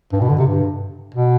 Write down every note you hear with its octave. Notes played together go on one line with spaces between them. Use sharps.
G2
B2
D3
C3
G2
B2